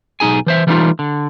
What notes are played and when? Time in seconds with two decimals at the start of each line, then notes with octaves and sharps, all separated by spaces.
0.20 B1 D#4 G#4 G#5
0.46 E3 C5 E5
0.67 E3 G3 A3 C4 D#4 F4
0.99 D3